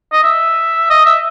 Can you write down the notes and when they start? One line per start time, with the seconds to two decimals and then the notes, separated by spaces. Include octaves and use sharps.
0.13 D#5
0.24 E5
0.90 D#5
1.06 E5